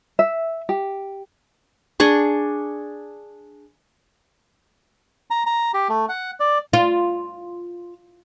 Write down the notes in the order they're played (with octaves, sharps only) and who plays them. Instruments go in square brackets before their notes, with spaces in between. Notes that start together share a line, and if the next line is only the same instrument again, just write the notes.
[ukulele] E5
G4
[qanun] D4 G#4 C#6
[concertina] A#5
A#5
G4
A3
F#5
D5
[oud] F4